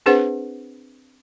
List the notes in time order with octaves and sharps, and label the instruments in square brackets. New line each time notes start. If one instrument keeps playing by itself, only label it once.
[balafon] C4 D4 G#4 B4 C5 F#5